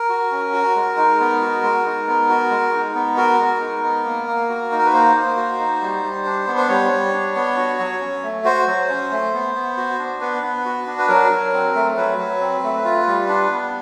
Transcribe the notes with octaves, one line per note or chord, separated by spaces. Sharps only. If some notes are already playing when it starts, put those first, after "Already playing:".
Already playing: A#4
F#4
C#4
F#4
G#3
D#4
B3
F#4
G#3
D#4
B3
F#4
G#3
D#4
B3
F#4 A#4
G#3
D#4
B3
A#3
A#3
F#4
D#4
A#4
B4
A#3 C5
A#3
F#4
D#4
G3
G3
D4
B3
C5
G3 C#5
G3
D4
B3
F#4
F#3
C#4
A3
F#4 C5
F#3
C#4
A3
B3
B3
F#4
D4
B3 B4
B3
F#4
D4
B4
F#3 A#4
F#3
C4
A3
F#3 B4
F#3
C4
A3
F4
G3
D4
B3